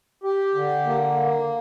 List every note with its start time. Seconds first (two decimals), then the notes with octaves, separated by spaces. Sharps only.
0.24 G4
0.55 D3
0.86 A#3